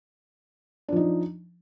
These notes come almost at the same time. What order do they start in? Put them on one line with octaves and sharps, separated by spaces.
D4 F3 D#4